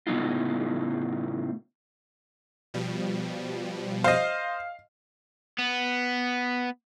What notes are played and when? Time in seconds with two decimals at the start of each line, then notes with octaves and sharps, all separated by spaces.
0.07 A2 C#3 F#3 B3 D#4 F4
2.74 B2 F3 G3
4.04 C5 D#5 F5
5.58 B3